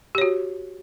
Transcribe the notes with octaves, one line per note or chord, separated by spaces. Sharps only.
F#4 G4 C#5